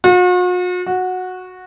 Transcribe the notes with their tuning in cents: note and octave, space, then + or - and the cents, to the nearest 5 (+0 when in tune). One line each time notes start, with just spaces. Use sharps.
F#4 -45
F#4 -10